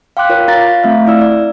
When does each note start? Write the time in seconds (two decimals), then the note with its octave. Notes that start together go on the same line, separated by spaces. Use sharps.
0.17 F5 G5 C6 D6 F#6
0.30 F4 A#4 C#5
0.48 F4 F5 A#5 A6 A#6
0.83 A3 C4 E5 F5
1.07 E4 D5 E6
1.21 D5